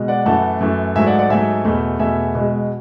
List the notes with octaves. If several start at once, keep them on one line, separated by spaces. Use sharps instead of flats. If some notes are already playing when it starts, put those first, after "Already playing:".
Already playing: B2 G#3
D5 F#5
F#2 E3 A3 F#5 A5
F#2 E3 A3
G#2 F#3 A3 E5 G#5
D5 F#5
D5 F#5
G#2 F#3 A3 E5 G#5
E2 B2 A3
E2 B2 A3 E5 G#5
B2 G#3